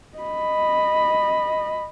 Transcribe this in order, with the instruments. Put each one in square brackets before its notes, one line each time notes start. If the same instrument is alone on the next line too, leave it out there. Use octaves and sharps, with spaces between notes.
[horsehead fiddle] D#5 B5